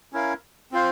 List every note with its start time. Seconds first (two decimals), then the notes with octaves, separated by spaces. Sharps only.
0.13 C#4 E4 A#4 F5
0.72 C4 F4 C5 F5